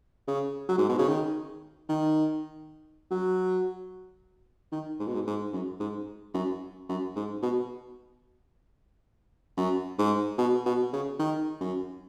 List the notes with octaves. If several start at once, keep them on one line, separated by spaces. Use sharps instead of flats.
C#3
F#3
G#2
B2
C#3
D#3
D#3
F#3
D#3
G#2
B2
G#2
G#2
F#2
G#2
F#2
F#2
G#2
B2
F#2
G#2
B2
B2
C#3
D#3
F#2